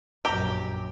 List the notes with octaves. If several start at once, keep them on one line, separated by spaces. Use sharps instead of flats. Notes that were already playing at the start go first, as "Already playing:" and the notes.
A#1 F#2 G4 A#5